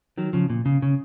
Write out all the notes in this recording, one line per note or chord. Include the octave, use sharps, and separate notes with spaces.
D#3 F#3
C#3 F3
A#2
C#3
C#3